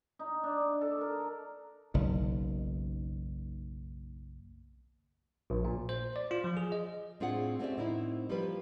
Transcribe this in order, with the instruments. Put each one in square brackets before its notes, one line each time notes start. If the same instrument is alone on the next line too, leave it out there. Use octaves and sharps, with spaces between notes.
[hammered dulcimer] D#4
D4
A4
A#4
[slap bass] F#1 B1 D#3
[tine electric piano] A#1
A#2
C5
D5
F4
F3
G#4
D#5
[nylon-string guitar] A2 C4 D4 F4 G#4 F#5
A3 C4 C#4 G4 D5 E5
A2 A#3 C4 D#4 E4
F3 G3 A#3 F4 G4 B4